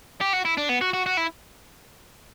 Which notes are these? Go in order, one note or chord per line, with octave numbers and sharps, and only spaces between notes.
G4
F#4
E4
D4
B3
F#4
F#4
F#4
E4